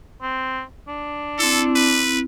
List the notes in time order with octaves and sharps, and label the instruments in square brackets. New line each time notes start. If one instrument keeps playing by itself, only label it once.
[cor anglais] C4
D4
[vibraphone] C4 E4 [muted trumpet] A4
[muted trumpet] B4